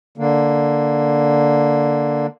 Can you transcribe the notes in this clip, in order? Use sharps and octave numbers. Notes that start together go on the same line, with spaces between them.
D3 A#3